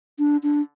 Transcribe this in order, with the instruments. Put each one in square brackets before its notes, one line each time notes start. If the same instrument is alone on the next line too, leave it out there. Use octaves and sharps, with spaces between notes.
[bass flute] D4
D4